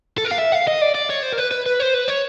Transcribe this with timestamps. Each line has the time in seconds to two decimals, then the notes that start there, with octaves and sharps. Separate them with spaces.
0.18 A4
0.25 A#4
0.31 F5
0.38 E5
0.52 F5
0.68 D#5
0.82 D5
0.95 D5
1.10 C#5
1.23 C5
1.33 A#4
1.38 B4
1.51 B4
1.66 B4
1.80 C5
1.94 B4
2.08 C#5